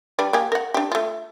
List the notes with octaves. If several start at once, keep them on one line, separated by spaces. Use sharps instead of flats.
G3 D4 B4
A#3 G4 G#4
A#4 F#5
D4 G4
A3 F4